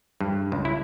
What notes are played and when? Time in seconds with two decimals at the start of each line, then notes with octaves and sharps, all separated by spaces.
0.21 G2
0.52 C#2
0.65 E4